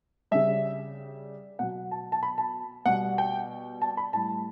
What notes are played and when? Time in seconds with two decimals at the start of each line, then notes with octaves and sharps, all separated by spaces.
0.31 C#3 G3 E5
1.59 B2 F#3 F#5
1.91 A5
2.12 A5
2.23 B5
2.38 A5
2.86 B2 G3 F#5
3.18 G5
3.82 A5
3.97 B5
4.13 A2 G3 A5